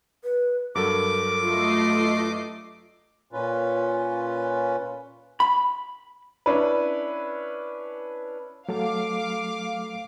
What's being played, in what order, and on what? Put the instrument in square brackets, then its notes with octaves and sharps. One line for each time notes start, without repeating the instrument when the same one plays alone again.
[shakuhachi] B4
[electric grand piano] G2 F#3 A4 [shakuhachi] A#4 [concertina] D6
[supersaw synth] A3 D#5 C7 [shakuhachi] F4
[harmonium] A#2 C#4 F4 B4
[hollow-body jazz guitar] B5
[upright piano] C#4 D4 E4 B4
[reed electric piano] F#3 A3 A4 [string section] F5 D6